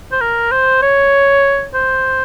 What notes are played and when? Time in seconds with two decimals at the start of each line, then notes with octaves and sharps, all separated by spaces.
0.12 C5
0.21 A#4
0.51 C5
0.82 C#5
1.74 C5